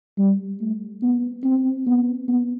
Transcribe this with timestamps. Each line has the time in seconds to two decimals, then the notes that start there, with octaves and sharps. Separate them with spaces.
0.18 G3
0.60 A3
1.02 B3
1.44 C4
1.86 B3
2.28 B3